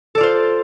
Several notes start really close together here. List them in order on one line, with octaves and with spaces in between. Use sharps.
A4 D5 F4 C5